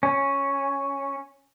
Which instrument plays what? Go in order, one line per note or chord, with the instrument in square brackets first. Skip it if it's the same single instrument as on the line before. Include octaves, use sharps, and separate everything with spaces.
[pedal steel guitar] C#4